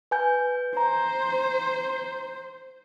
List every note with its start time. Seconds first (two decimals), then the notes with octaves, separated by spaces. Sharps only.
0.11 B4 G#5 G6
0.77 C5 A#5